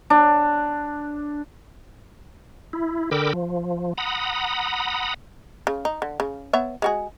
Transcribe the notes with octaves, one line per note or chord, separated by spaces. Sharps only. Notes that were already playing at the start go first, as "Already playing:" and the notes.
D4
E4
D3 A#4 G5 B5 D6 E6
F3
F#5 A#5 B5 D#6
C#3
D#4
D3
C#3
B3 C#5 E5
G#3 F#4 G#4